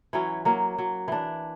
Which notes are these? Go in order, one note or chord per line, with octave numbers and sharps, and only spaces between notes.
E3 F#3 C#4
F#3 A#3
F#3
E3 D4